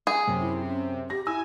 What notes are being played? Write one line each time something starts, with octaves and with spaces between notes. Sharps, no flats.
G#4
F#2 C3
E4
C#4
G4 A#6
E4 G#5 E6